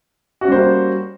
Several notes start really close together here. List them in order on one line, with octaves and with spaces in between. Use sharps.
F#4 C#4 G3 C5 A#3